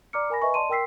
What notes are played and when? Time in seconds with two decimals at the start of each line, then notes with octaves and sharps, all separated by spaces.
0.13 D5 A#5 D6 F6 C#7
0.30 A#4 G#5 B5 A#6
0.42 B4 D#5 E5 G#5 B5 C#6
0.54 D5 D#5 A5 C6 D#7
0.69 A#4 G5 C6 E6 B6 C7